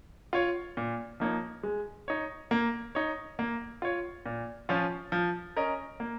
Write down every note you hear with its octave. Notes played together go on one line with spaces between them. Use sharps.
F4 C#5
A#2
F3 A#3 D#4 C#5
G#3
D#4 C#5
A#3
D#4 C#5
A#3
F4 C#5
A#2
F3 C#4 F4
F3
C#4 A#4 D#5
A#3